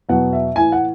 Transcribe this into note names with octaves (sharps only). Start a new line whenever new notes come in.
E2 B2 F#3 F#5
E5
A2 E3 G#5
F#5